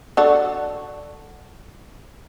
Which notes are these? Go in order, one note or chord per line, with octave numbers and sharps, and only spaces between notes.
D4 F#4 A4